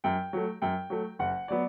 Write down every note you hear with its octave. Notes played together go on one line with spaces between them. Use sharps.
F#2 G5
F#3 A3
F#2 G5
F#3 A3
F#1 F#5
F#3 B3 D5